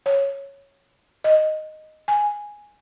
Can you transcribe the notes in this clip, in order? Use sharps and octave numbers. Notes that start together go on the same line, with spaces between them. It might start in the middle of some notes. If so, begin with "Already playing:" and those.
C#5
D#5
G#5